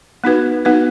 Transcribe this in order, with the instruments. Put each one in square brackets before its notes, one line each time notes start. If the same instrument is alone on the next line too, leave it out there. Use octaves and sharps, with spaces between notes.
[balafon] B3 D#4 F#4 B4
B3 D#4 F#4 B4